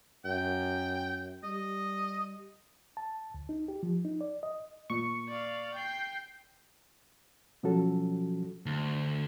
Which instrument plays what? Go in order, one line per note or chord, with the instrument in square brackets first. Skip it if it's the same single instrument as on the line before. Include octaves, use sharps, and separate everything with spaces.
[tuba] F#2 [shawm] G5
[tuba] G3 [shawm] D#5
[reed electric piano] A5
D2
D#4
G4
F3
D#4
D5
D#5
[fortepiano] A#2 [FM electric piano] C#6
[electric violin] D5 F5
G5 C7
[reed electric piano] B2 F3 F#3 C#4 F#4 A4
[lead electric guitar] D2